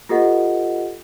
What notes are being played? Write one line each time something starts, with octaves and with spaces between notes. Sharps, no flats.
F4 G4 A4 B4 D#5 F#5